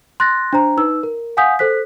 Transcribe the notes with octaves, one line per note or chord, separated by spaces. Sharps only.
C6 F#6 A6 A#6
D4 C5 A#5
D#4 B4 E6
A#4
F5 F#5 G#5 D#6 G6 B6
A4 C5 F#6 B6